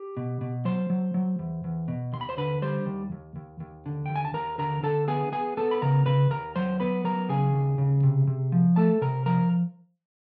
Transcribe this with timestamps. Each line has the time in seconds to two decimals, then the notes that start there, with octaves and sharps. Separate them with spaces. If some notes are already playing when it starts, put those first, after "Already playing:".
Already playing: G4
0.17 B2
0.41 B2
0.65 F#3 C5 C6
0.90 F#3
1.14 F#3
1.39 E2
1.64 E2
1.88 B2
2.12 D#2 C6
2.21 B5
2.29 C5 C6
2.38 D3 B4 B5
2.62 G3 C5 C6
2.86 D#2
3.12 D#2
3.36 D#2
3.60 D#2
3.86 D3
4.06 D#2 G5
4.16 G#5
4.25 A5
4.34 D#2 A#4 A#5
4.58 D3 A#4 A#5
4.83 D3 A4 A5
5.08 B3 G#4 G#5
5.32 B3 G#4 G#5
5.57 B3 A4 A5
5.71 B5
5.82 C#3 A#4 A#5
6.06 C#3 B4 B5
6.30 D#2 A#4 A#5
6.56 F#3 C5 C6
6.80 B3 B4 B5
7.04 F#3 A#4 A#5
7.29 C#3 G#4 G#5
7.53 D#2
7.78 C#3
8.03 C3
8.27 C3
8.52 F3
8.76 A3 A4 A5
9.01 C3 A#4 A#5
9.26 F3 A#4 A#5